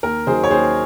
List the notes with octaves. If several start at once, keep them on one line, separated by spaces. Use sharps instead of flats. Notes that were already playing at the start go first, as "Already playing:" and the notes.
D#2 A#4
D#3 F#3 G#4 C5
C#5
D#2 G#4 C5